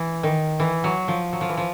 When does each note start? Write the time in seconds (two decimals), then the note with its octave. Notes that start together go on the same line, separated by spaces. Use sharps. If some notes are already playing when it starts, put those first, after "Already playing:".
Already playing: E3
0.23 D#3
0.60 E3
0.84 F#3
1.08 F3
1.33 F#3
1.41 F3
1.49 E3
1.57 F3